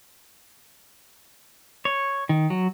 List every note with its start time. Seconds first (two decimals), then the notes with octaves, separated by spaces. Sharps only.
1.85 C#5
2.29 D#3
2.50 F#3